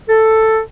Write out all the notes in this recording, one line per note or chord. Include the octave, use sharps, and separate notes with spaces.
A4